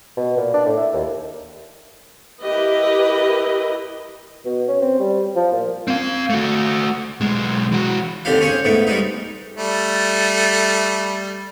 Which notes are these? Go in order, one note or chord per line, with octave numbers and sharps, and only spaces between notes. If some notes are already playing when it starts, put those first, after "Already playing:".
B2
A#2
D4
A2
E4
D#2
E4 G4 A#4 B4 D#5
B2
C#4
C4
G3
F3
A#2
C4 F5
A3 F#4
B1 G#3
E3 F#4
D#2 D3 C4 G4 F5
C#4 G#4 C5 C#5
G#2 A3 B3
G3 G#3 D#4
G3 A3